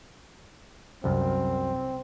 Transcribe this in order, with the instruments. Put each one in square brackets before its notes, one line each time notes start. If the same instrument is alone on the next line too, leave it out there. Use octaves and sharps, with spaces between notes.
[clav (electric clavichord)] C2 F#2 [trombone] C4